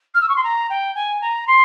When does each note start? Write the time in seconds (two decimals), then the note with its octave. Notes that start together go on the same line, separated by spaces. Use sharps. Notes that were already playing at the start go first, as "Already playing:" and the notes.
0.14 F6
0.21 E6
0.29 C#6
0.36 C6
0.43 A#5
0.70 G5
0.95 G#5
1.21 A#5
1.47 C6